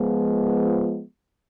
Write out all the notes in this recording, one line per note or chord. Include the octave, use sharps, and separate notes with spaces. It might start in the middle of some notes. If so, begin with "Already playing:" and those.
Already playing: F3 G#3 B3